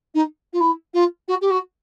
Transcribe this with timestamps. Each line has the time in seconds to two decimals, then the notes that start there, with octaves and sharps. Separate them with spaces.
0.14 D#4
0.53 F4
0.60 E4
0.93 F4
1.28 F#4
1.41 G4
1.50 F#4